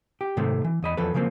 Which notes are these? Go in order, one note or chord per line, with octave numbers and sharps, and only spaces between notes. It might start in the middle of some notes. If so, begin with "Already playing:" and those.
G4
G#2 C3 D#3 F#3 G#3 A3
E3
E2 D#5 B5
E2 F3 A4 B4
C#3 F3 F#3 A#3 C4